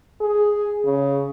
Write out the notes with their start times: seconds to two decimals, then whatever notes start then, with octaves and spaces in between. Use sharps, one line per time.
0.21 G#4
0.85 C#3